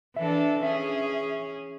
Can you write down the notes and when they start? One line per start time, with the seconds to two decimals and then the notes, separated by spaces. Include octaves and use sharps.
0.16 E3 D4 A4 E5
0.63 C#4 G#4 E5